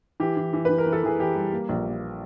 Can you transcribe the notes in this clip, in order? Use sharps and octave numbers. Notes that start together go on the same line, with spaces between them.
E3 G4
E3
E3
E3 B4
A#4
E3
A4
E3 G#4
E3 G4
G3
A#3
A#1
A#3